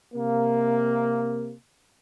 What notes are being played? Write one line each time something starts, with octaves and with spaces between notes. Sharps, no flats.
C3 A#3